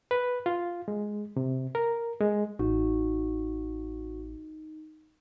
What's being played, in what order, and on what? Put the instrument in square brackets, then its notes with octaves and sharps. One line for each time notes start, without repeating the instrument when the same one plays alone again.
[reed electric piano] B4
F4
G#3
C3
A#4
G#3
[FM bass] A1 [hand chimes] D#4 [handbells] F#4